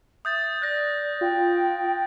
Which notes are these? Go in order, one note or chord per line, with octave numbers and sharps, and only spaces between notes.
E5 D#6 G6 A6
D5 F#6 A#6
F4 G5